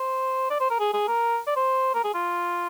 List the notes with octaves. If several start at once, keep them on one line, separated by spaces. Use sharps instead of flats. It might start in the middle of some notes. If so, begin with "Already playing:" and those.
Already playing: C5
D5
C5
A#4
G#4
G#4
A#4
D5
C5
A#4
G#4
F4